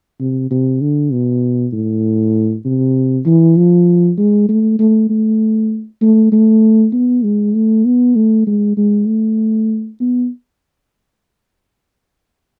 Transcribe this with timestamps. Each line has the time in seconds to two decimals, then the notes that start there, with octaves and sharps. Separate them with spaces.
0.20 C3
0.51 C3
0.81 D3
1.12 B2
1.73 A2
2.65 C3
3.26 E3
3.57 F3
4.18 G#3
4.49 A3
4.79 A3
5.10 A3
6.02 A3
6.32 A3
6.93 B3
7.24 G#3
7.55 A3
7.85 B3
8.16 A3
8.47 G#3
8.77 G#3
9.07 A3
10.00 B3